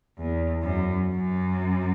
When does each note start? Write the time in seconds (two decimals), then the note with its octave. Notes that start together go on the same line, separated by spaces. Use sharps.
0.18 E2
0.62 F#2
1.08 F#2